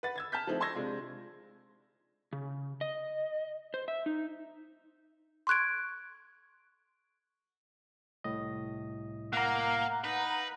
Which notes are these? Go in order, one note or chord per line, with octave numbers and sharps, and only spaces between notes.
B4 F#5 A6
E6 G#6 A6
A5 F6 G6 B6
F3 A3 C4 D#4 E4 C5
A5 C6 C#6 E6 G#6 A#6
C3 G#3 D4 F4
C#3
D#5
C5
E5
D#4
C6 C#6 F#6 G#6 D7
C2 A2 D#5
A#3 F5 F#5 A#5
D#4 B4